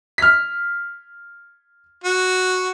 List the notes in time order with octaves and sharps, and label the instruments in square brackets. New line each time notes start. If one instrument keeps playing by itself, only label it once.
[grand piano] F6 B6
[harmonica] F#4